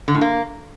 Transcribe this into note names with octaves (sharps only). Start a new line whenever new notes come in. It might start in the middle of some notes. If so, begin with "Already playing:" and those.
D3
A2
A#3